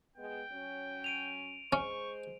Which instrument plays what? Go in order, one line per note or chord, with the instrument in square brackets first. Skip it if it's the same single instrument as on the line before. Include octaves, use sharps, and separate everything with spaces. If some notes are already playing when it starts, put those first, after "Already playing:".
[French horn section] G#3 B3 [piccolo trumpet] G5
[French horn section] F#3 C#4
[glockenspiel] D7 D#7 F7
[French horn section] G#3 C5 [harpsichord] C#4 [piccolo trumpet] C#6